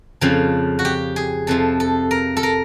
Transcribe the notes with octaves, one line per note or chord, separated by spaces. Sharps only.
F2 C#3 F3
F#4
G4
G#4
F2 C3 F3 A4
A4
A#4
A4
A#4